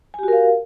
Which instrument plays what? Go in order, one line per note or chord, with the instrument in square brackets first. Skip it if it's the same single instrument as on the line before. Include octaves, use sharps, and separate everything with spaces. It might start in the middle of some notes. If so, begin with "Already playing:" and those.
[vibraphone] G#5
G4
F#4
A#4
F5